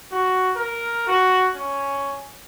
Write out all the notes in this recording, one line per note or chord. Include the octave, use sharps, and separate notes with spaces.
F#4
A#4
F#4
C#4